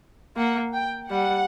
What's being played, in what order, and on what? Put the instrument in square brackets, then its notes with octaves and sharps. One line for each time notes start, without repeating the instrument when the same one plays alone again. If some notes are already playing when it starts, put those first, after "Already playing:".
[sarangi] A#3 [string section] F#5
[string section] G5
[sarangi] G3 [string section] F#5